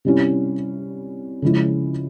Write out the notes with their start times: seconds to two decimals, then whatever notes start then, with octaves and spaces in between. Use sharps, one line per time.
0.05 C3 G3 C#4 E4
1.42 C#3 F3 G#3 C#4 E4